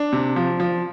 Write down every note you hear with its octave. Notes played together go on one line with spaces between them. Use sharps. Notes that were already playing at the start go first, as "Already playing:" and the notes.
Already playing: D4
C3
F3
F3